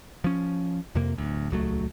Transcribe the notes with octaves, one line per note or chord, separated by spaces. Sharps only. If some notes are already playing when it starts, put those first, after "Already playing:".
F3 C#4
F2 C3 A#3
D1 D2
D#1 C#2 F#3 A3